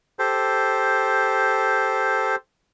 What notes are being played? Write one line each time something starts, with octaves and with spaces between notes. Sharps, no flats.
G4 A4 C5